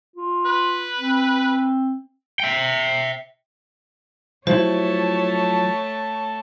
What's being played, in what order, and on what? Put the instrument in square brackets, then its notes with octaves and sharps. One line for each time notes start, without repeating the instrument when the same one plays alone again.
[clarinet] F4
[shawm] B4
[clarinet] C4
[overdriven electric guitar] E5 G5
[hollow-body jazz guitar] F3 F#3 E4 [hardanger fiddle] A3 A5 [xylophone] C5 [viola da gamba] C#5